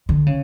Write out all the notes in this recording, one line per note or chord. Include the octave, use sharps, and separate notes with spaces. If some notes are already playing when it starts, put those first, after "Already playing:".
D3
C#3